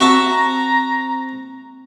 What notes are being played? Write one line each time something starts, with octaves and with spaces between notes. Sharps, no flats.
C4 F#4 E5 A5 A#5